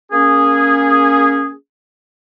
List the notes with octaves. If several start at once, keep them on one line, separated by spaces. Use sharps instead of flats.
A#3 C#4 G#4